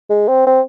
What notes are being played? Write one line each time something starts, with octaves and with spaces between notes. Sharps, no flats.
G#3
C4
C4